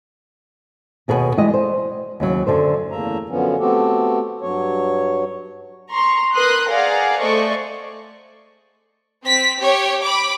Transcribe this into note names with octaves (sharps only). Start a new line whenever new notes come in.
D#2 B2 G#4 A#4 C#5 F#5
E3 G3 G#3 G4 D#5
C5
D#2 C#3 F#3
F#2 D3 D4 C5
E2 C#3 A3 A#3 E5 A#5
F#2 D3 F3 B3 C#4
A3 B3 C4 F#4 G4 A4
G2 F#3 C#5
A#5 C6 C#6
A#4 B4 C6 D#6 F#6
G#4 D5 F5 F#5 A#5
A3 A4 C5 D5 D#5 C#6
C4 B6
G4 C#5
B5 D6